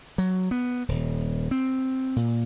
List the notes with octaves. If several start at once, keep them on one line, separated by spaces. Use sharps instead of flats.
F#3
B3
D#1
C4
A#2